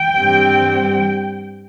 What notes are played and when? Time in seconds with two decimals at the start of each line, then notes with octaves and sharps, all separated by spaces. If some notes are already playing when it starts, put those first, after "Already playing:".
Already playing: G5
0.17 G2 G3 C4